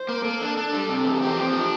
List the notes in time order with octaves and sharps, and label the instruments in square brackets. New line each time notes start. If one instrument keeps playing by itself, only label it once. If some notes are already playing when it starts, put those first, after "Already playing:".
Already playing: [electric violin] C5
[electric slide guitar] A#3
[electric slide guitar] A#3 [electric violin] A4
[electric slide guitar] D4
D4
G3
C3
E2
[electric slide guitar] C4 [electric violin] G4
[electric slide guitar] F3
D4